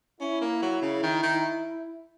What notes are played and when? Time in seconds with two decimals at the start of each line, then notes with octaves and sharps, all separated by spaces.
0.21 C#4 E4
0.41 A#3
0.62 F#3
0.82 C#3
1.03 D#3
1.23 D#3